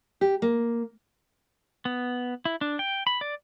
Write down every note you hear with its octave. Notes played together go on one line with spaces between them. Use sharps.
G4
A#3
B3
E4
D4
G5
B5
D5